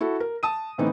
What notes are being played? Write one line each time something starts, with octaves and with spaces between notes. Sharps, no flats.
E4 F#4 A4
A#4
A5 D#6 D#7
A2 D3 E3 B3 C4 D#4